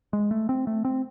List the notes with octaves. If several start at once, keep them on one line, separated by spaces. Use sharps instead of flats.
G#3
A3
C4
A3
C4